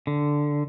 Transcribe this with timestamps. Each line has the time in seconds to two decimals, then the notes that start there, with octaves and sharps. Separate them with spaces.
0.07 D3